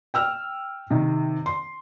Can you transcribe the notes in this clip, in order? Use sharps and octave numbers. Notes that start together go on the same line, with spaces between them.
G5 E6 F6
C3 D#3
C6